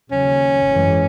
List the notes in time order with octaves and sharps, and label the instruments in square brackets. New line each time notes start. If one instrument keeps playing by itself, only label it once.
[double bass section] D#2 C#3 F#3 [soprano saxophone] C#4
[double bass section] G#1 F#2 E3 G#3